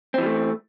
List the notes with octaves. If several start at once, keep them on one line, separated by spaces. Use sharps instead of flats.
E3 G3 A3 C4